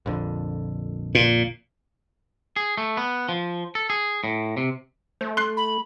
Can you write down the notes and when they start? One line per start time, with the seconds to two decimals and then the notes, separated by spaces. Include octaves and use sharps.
0.06 A#1 F2 D3
1.15 A#2
2.56 G#4
2.78 A3
2.97 B3
3.29 F3
3.75 A4
3.90 G#4
4.24 A2
4.57 C3
5.21 A3 C5
5.37 C6 F#6 C7
5.57 B5